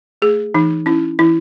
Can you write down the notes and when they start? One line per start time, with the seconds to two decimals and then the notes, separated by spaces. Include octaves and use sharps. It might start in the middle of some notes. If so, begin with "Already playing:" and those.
0.22 A3 G#4
0.54 E3 D#4
0.86 C#4 E4
1.19 E3 E4